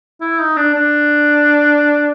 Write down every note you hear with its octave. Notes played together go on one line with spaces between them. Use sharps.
E4
D#4
D4
D4